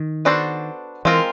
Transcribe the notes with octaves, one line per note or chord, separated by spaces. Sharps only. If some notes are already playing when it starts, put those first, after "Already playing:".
Already playing: D#3
B3 D4 F#4 A4 C5
E3 G#3 C4 F4 A#4